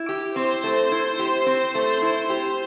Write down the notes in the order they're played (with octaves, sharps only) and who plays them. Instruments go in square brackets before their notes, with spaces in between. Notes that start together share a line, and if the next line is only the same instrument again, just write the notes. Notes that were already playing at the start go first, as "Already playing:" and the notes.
Already playing: [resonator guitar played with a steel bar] E4
G4
[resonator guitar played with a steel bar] C4 [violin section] C5
[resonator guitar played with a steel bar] A3
E4
G4
C4
A3
E4
G4